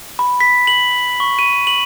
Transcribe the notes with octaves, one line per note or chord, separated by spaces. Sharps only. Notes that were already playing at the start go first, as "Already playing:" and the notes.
B5
B6
F#7
C#6
D#7
F#7